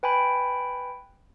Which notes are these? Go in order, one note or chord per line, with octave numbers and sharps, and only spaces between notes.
B4 G5 G#5 B5